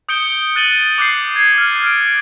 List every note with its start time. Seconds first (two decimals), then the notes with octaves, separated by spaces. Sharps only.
0.09 D#6 G6 C#7 D7 G7
0.56 F#6 A6 D#7 F#7 G7
0.98 D6 F#6 G6 C7
1.36 G#6 C7
1.58 F6
1.84 F6 D7